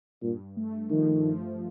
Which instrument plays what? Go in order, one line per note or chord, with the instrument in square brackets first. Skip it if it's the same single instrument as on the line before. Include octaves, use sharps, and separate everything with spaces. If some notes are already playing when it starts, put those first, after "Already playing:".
[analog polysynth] G2 [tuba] A#2
[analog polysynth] A3
[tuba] D#3 [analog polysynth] F3
[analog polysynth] F3